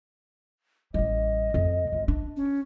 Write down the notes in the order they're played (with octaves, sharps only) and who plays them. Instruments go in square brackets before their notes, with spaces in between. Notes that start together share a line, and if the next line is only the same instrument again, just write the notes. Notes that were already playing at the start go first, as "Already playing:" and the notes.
[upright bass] A1 G3 [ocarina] D#5
[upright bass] F2
G#1 F4
D4
[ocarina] C#4